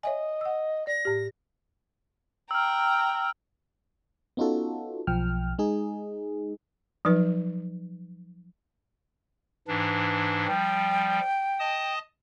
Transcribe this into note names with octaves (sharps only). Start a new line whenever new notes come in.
C#5 D#5 E5 G#5
F#5 E6
D5 A#6
A2 G4
G5 A#5 E6 F6
B3 C#4 D#4 F4 F#4 A4
B1 F3 G5 F6
G#3 D#4 G#4
F3 F#3 D#4 B4
G#2 E3 D4
F3 G3 G5
D#5 A5 D#6